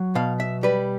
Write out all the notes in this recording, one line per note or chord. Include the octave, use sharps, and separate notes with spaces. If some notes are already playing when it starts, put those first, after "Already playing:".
Already playing: F#3
B2 F5
E5
G3 B4